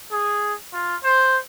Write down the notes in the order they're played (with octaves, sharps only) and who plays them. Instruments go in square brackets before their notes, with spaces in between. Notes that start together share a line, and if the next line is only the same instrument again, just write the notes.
[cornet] G#4
F4
C5